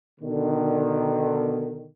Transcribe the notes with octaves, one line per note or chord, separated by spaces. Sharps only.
B2 D3 D#3